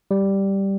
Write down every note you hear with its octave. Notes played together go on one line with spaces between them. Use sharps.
G3